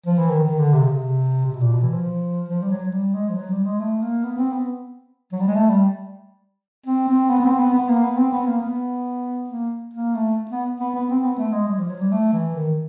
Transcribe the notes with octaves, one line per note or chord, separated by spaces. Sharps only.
F3
E3
D#3
D#3
D3
C3
C#3
C3
C3
B2
A#2
B2
E3
F3
F3
G3
F#3
F#3
G3
G#3
F3
F#3
G3
G#3
A3
A#3
B3
C4
B3
F#3
G3
G#3
A3
G3
C4
C4
B3
B3
C4
B3
B3
A#3
B3
C4
B3
A#3
B3
A#3
A#3
A3
B3
B3
B3
C4
B3
A3
G#3
G3
F3
F#3
G3
A3
E3
D#3